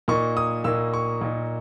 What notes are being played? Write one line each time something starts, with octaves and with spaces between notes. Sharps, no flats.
A#2 A#3 D#4 C#6
D#6
A#2 A#3 D#4 E6
C#6
A#2 A#3 D#4